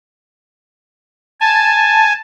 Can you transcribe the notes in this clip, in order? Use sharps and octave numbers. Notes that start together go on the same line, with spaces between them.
G#5 A5